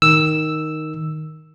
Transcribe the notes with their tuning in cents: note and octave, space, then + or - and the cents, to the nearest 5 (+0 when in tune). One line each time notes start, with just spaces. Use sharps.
D#3 +0 E6 +0